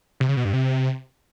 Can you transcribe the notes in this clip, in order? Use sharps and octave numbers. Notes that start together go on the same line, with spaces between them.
C3
C#3
B2
G2
C3